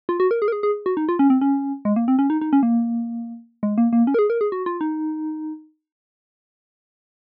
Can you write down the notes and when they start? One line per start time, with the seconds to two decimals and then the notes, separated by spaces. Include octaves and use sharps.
0.09 F4
0.20 F#4
0.31 A#4
0.42 G#4
0.48 A#4
0.52 G#4
0.63 G#4
0.86 F#4
0.97 D#4
1.09 F4
1.19 C#4
1.30 C4
1.41 C#4
1.85 G#3
1.96 A#3
2.08 C4
2.19 C#4
2.30 D#4
2.41 D#4
2.53 C#4
2.63 A#3
3.63 G#3
3.78 A#3
3.93 A#3
4.07 C#4
4.14 A#4
4.19 G#4
4.30 A#4
4.41 G#4
4.52 F#4
4.66 F4
4.81 D#4